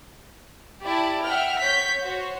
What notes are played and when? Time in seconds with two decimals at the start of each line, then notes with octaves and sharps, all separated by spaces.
0.82 E4 G4 D5 A5
1.25 E5 F#5 G5 F6
1.62 C#5 G6 B6
2.02 F#4 C5 C#5